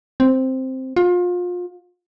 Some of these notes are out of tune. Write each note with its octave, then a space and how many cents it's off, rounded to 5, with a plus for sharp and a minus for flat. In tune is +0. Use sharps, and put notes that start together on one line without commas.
C4 +0
F4 +30